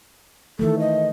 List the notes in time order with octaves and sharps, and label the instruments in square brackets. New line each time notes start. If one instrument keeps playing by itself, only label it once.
[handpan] D#3 E3 A3 [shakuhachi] A4
[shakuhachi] D#5